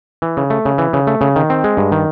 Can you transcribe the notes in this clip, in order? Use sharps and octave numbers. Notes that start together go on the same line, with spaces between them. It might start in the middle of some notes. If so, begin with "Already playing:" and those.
E3
C#3
A3
C#3
E3
C#3
A3
C#3
D#3
C4
G#3
G2
D#3